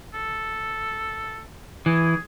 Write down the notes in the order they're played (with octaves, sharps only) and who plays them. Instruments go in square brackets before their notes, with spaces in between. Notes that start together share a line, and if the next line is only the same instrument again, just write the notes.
[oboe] A4
[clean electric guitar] E3 [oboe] G#4